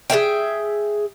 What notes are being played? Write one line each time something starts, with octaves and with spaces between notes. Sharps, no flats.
G#4 A#4 E5 G5